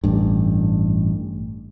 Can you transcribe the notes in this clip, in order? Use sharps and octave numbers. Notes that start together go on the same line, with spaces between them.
A1 G2